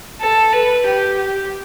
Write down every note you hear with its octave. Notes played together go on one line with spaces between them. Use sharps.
A4
B4
G4
G4